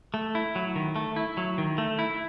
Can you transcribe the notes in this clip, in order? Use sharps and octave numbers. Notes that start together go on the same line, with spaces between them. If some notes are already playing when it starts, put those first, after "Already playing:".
A3
E4
F#3
D#3
A3
E4
F#3
D#3
A3
E4